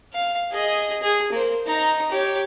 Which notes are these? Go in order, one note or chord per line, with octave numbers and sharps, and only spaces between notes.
F5
G#4 D#5
G#4
A#3 C5
D#4 A#5
G4 C#5